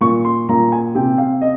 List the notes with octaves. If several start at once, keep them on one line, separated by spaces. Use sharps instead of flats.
A#2 C#6
C6
A#2 A#5
G#5
C3 G5
F5
D#5